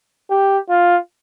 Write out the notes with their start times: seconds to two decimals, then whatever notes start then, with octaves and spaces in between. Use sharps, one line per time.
0.30 G4
0.70 F4